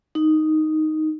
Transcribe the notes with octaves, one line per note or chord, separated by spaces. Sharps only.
D#4